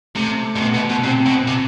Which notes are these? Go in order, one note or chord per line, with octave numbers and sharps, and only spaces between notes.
C3 A3
B2
C3 B3
B2
B2
C3 C4
B2
C3